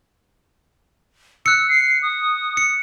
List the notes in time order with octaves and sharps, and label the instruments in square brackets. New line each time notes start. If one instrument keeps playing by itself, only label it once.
[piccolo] E6 [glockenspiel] F#6 C#7
[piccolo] C7
D#6
[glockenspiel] C#7